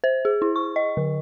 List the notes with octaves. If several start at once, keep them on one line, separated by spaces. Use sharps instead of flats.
C5
G#4
E4
C#6
D#5
D3